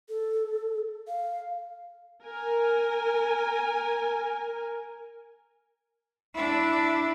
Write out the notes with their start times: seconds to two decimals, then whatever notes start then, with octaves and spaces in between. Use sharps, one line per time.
0.09 A4
1.08 F5
2.21 A#4 G#5
6.34 D4 E4